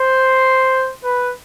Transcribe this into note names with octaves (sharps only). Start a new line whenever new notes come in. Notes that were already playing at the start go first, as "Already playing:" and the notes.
Already playing: C5
B4